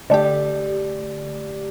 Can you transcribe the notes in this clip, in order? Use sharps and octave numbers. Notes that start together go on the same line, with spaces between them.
D3 A3 G4 D5